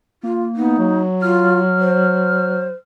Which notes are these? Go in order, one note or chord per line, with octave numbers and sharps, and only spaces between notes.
A#3 F4
B3 D#4
F#3
F4 F6
C5